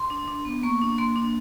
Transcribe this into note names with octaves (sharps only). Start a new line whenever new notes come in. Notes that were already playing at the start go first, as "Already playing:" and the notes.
Already playing: C6
D4
D4
B3
A#3 C#6
D4
A#3 C6
D4